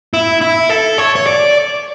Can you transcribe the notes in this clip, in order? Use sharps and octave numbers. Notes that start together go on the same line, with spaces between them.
E4
E4
A4
C#5
C#5
D5